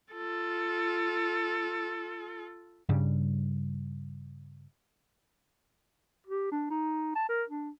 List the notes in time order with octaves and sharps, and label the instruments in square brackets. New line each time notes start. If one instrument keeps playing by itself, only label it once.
[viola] F4 A4
[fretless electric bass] G2 C#3 G3
[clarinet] G4
D4
D#4
A5
A#4
D4